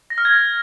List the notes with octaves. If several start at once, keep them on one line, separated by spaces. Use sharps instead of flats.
A#6
F6
G#6